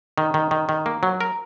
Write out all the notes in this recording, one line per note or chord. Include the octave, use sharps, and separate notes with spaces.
D#3
D#3
D#3
D#3
A#3
F#3
A#4